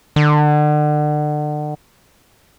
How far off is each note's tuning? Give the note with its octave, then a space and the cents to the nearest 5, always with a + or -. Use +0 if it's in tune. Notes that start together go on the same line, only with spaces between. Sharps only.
D3 +35